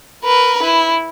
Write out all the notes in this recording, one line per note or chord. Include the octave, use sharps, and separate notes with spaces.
A#4 B4
E4